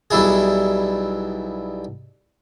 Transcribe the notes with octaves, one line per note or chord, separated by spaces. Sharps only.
B1 G3 E4 G#4